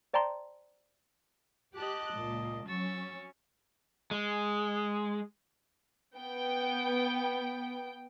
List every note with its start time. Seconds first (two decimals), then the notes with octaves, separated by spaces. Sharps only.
0.14 C5 D5 G5 A5 A#5 C6
1.75 G4 D#5 A5 D6 F#6
2.15 C#2 A#2
2.68 F#3 C#4 C#6 E6 A6
4.11 G#3
6.17 B3 G5